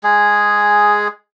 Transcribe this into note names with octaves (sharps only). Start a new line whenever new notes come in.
G#3 G#4